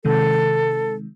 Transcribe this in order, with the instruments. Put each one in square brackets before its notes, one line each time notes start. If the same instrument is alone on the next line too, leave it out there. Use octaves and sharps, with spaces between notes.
[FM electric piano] C3 D#3 G#3 [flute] A4